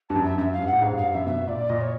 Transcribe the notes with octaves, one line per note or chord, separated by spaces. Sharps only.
G2 A5
F#2
E5
F#2 E5
F5
G2
F#5
A2
G#2 F5
G2
F5
G2
F#2 E5
B2 E5
A#2 D5
A#2 D#5
C#5